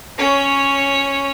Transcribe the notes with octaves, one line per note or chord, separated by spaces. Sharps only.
C#4 C#5